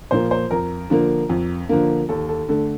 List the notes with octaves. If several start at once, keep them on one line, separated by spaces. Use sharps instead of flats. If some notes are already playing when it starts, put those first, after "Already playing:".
A#2 F3 A#3 C5
C5
F2 A#4
D3 F3 A#3
F2
D3 F3 A#3
D#2 A4
A4
D3 A3 A4